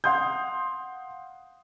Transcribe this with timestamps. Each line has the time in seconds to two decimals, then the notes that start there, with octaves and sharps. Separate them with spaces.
0.04 F5 F#5 C6 D#6 G6